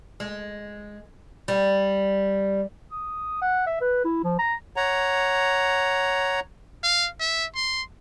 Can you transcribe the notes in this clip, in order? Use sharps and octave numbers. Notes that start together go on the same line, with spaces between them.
G#3
G3
D#6
F#5
E5
B4
E4
F3
A#5
C#5 F#5 A#5
F5
E5
C6